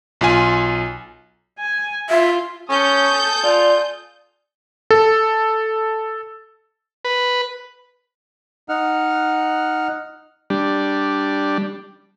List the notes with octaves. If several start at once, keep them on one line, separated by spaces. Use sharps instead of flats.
B1 F4 G#5
G#5
F4 E5
C#4 A4 G#5 D#6 G6
F4 D5
A4
B4
D#4 F#5 F6
G3 D4